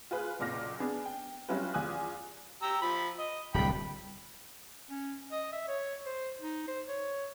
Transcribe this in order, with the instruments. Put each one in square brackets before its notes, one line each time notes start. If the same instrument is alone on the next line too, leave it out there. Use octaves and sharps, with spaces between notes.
[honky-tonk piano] F4 G#4 B4
F#1 B1 A#2 F4 F6 A#6
B3 D4 G#4
G5
F#3 G3 C#4 E4 F4 B4
E2 F4 G#5 D#6 F#6
[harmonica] G4 A#5 E6
F3 B5
D#5
[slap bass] D1 C2 [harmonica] G5 B5
[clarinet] C#4
D#5
E5
C#5
C5
D#4
C5
C#5